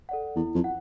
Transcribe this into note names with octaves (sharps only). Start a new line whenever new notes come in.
A4 D5 F#5
E2 E4
F2
F#5